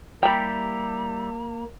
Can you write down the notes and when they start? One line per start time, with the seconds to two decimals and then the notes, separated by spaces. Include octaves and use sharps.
0.23 G3 A#3 E4 G4 G5 A#5 B5